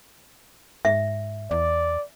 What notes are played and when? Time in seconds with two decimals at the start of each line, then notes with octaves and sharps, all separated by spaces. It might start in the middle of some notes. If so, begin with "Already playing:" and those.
0.85 G#2 E5
1.51 E2 D5